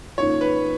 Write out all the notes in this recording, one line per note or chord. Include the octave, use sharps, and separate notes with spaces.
G#2 D#3 A#3 C#4 F4 C#5
B4